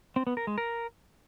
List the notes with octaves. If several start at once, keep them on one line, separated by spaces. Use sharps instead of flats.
C4
B3
A#4
G#3
A#4